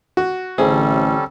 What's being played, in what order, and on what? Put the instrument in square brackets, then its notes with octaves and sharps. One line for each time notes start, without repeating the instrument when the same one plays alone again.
[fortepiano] F#4
[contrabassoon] A1 [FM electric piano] D3 C4 E5 [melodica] G3 C#4 A4 [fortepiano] G#4